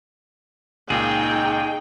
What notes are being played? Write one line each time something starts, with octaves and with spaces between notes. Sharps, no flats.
C#2 A#2 D#4 G#4 G5